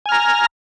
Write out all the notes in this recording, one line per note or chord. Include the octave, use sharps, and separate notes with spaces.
G#5 A#5 F6